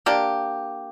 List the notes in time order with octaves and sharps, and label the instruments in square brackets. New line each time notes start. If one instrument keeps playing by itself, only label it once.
[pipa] A#3 D4 G4